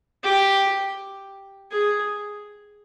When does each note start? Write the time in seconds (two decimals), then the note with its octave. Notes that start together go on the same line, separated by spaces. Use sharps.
0.24 G4
1.72 G#4